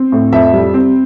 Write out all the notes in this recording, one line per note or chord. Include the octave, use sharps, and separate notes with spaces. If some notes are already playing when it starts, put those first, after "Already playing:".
Already playing: C4
A2
F2 E5
G3
C4